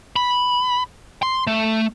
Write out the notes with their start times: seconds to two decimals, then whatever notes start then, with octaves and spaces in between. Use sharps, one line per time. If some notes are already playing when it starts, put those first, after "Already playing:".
0.16 B5
1.23 C6
1.47 A3